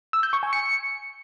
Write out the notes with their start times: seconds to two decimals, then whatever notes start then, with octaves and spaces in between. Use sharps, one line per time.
0.13 E6
0.23 G6
0.33 C#6
0.43 G#5
0.53 C#7